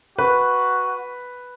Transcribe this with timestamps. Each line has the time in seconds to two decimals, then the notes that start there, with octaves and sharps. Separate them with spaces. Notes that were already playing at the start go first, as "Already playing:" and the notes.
0.18 F#4 B4